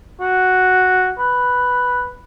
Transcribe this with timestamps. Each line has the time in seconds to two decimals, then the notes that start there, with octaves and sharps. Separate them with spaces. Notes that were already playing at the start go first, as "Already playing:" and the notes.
0.20 F#4
1.19 B4